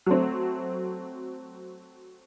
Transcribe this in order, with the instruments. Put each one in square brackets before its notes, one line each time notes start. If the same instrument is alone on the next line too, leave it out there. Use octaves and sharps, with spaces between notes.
[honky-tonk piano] F#3 A3 C4